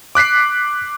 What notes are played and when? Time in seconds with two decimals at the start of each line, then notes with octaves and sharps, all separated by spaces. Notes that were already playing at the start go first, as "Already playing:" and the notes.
0.15 D6 F#6 B6 C7